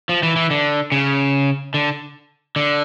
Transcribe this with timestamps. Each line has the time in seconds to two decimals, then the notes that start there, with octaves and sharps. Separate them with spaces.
0.09 F3
0.23 E3
0.36 E3
0.51 D3
0.92 C#3
1.74 D3
2.56 D3